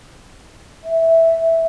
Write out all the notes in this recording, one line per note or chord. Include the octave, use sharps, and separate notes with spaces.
E5